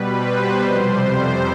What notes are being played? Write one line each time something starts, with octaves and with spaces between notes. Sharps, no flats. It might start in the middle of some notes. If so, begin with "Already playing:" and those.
Already playing: B2 G3 B4
C5
F2 C3 G3 C5